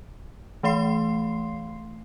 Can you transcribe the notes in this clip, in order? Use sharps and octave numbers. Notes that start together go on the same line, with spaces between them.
E3 A3 F5 C6 C7